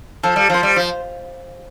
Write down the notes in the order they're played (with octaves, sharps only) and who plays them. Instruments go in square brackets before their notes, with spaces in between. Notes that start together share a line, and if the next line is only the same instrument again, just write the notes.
[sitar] F3 [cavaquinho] A4
[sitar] G3
[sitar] F3 [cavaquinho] C5
[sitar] G3
F3